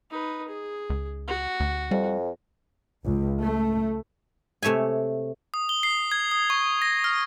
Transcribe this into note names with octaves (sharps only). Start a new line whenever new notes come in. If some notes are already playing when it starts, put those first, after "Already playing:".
D#4 B4
G#4
C#2
F#4
D2
F2 G3
C#2
A3
C3 A3 C#5 E5 G#5
D#6
G7
C7
G#6
D#6
C#6
A#6
F6